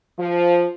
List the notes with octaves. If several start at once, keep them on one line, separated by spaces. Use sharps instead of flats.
F3